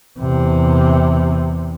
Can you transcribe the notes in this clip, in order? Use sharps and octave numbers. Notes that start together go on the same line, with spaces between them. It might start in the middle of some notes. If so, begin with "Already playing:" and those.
E2 C3